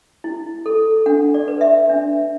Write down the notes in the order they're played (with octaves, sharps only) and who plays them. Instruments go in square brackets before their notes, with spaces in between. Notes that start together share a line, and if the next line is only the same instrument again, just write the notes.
[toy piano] E4
A4
D4 F#5
D5
B4
E5
D4